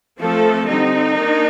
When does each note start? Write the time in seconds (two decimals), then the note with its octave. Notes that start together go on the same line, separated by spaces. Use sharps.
0.19 F3 A3 C4 A4
0.68 D3 G3 C4 D#4
1.17 D#3 A#3 D4